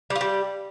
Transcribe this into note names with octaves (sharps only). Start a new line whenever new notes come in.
G3
F4
G3